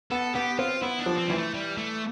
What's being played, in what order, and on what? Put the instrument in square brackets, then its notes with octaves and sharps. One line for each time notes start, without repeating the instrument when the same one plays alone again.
[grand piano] B3 [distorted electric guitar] A4
[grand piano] B3 [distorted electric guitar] G4
[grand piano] C4 [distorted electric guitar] F4
[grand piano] B3 [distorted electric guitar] E4
[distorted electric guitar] D4
[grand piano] F3
[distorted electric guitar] C4
[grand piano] E3 [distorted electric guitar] G3
[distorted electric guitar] A3
G3
A3